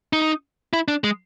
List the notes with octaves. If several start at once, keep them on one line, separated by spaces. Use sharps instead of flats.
D#4
E4
D4
G#3